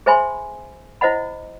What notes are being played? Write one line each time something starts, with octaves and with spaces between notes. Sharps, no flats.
G#4 C5 E5 G#5 B5 C6
E4 C5 D#5 F#5 B5